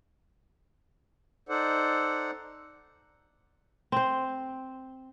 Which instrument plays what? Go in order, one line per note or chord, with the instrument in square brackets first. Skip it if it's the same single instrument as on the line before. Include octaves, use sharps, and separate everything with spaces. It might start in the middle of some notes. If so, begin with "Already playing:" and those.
[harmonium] D#4 A4 C5 D5 F#5
[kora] C4 C5